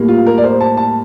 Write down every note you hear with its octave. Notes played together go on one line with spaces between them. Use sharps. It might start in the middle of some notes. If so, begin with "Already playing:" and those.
Already playing: A2 G3 A#3
F4
A#4
D5
C5
A5
A5